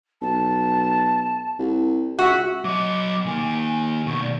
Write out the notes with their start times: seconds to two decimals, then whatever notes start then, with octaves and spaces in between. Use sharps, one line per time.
0.22 B1 A5
1.59 C2
2.19 C#2 F#4 E5
2.64 F#3 D#5 D6
3.26 D#3 A#3 G#5
4.07 B2 D#3 C#6
4.23 D5